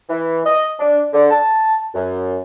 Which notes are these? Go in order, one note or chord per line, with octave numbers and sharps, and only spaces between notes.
E3
D#5
D4
D3
A5
F#2